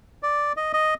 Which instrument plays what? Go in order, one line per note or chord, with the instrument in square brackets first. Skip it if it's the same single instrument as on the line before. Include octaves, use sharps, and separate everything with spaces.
[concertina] D5
D#5
D#5